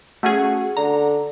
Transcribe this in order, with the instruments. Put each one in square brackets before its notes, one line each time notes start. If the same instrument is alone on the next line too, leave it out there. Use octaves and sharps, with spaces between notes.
[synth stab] A3 C#4 G#4 [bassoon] F#4
[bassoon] D3 [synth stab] A#5